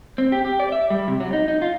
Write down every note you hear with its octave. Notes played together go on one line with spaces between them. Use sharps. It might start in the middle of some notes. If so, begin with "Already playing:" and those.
C4
G4
G4
D5
E5
G3
C3
F#3
D#4
D#4
F4